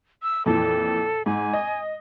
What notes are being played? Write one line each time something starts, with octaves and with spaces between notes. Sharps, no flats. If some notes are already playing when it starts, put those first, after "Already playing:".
E6
F2 A#2 E3 A4
G#2 G#5
D#5